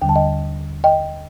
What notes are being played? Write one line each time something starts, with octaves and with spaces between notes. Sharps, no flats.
D#2 D3 G3 G5
A5
D#5 G5
D#5 G5